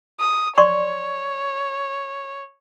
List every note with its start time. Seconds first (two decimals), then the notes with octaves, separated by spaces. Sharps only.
0.20 D#6
0.58 C#5 D5 C6 C#6